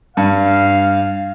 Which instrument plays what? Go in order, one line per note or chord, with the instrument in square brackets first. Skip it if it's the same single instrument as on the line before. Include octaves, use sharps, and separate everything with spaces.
[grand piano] G2 [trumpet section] F5